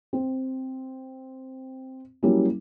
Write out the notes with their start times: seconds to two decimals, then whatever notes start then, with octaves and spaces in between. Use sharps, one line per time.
0.13 C4
2.23 F#3 G3 A#3 C#4 E4